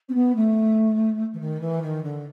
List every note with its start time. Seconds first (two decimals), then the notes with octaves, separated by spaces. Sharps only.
0.09 C4
0.14 B3
0.35 A3
1.33 E3
1.39 D#3
1.60 E3
1.82 D#3
2.03 D3